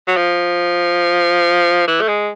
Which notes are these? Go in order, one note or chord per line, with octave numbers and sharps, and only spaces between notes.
F#3
F3
E3
A3
G#3